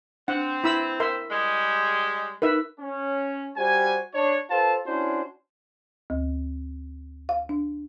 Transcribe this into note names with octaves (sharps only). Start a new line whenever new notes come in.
C4 D4 F#5
E4 B5 E6
A#4 E5 C6
G3 G#3
D#4 A#4 B4 E5
C#4
G3 F#4 G4 C5 G#5
D4 C#5
F4 A4 B4 C5 A5
C#4 D4 E4 F#4 C5
D2
F5
D4